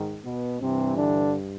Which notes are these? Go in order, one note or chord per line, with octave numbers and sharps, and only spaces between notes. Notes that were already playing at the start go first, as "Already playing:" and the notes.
Already playing: G#2 D#3
B2 B3
G2 C3 E3 C4
D3 D4